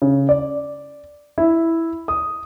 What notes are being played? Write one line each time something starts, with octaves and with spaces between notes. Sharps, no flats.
C#3
D5
E4
D#6